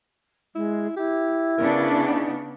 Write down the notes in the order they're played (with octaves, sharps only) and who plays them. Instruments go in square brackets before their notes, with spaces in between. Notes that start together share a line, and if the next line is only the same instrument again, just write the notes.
[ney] G#3 [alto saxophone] E4
[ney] E4 [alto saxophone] G4
[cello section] C#3 B3 D4 [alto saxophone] A#4
[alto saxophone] D#4